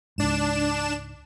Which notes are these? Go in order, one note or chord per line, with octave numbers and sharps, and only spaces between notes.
C#2 G#2 D4 E7